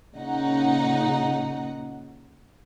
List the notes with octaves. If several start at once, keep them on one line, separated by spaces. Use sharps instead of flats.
A#2 C#3 D#4 F#5